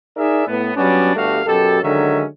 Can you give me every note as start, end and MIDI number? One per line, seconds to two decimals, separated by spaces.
0.17 0.46 63
0.17 0.46 68
0.17 0.46 70
0.17 0.46 74
0.17 0.46 76
0.46 0.71 45
0.46 0.71 59
0.76 1.12 54
0.76 1.12 55
0.76 1.12 59
0.76 1.12 61
0.76 1.12 62
1.16 1.41 31
1.16 1.41 43
1.16 1.41 55
1.16 1.41 57
1.16 1.41 66
1.16 1.41 77
1.46 1.80 42
1.46 1.80 47
1.46 1.80 67
1.46 1.80 69
1.82 2.23 50
1.82 2.23 51
1.82 2.23 54
1.82 2.23 56
1.82 2.23 61
1.82 2.23 76